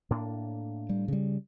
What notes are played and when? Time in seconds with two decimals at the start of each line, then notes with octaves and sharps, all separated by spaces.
0.10 A2 A#3 D4
0.89 G3
1.08 C#3 G3